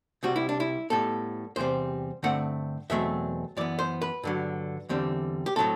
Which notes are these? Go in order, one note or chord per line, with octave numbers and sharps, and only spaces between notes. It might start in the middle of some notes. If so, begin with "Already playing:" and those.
C2 C3 G3 F#4
E4
D4
E4
A2 G3 B3 A4
E2 C3 G3 C4 C5
G2 D3 A3 C4 F#5
E2 B2 F#3 A3 C4 E5
F#2 E3 B3 D5
C5
B4
G2 D3 F#3
E2 D3 G3 C4
G4
A2 F#3 A3 C4 A4